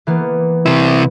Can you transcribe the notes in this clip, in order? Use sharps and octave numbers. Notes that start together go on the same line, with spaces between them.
E3 A#3 B3
C3 E4